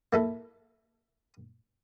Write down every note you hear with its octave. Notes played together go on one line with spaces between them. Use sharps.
A#3 E4 A4